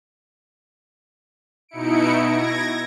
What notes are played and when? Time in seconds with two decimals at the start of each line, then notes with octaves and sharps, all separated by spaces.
1.69 B2 D#4 E4 C#7 D7
2.22 G#6 A#6